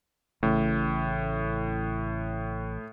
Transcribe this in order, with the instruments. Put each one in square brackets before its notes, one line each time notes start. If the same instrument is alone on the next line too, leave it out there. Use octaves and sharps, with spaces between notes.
[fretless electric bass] A1 C#3 [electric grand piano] A2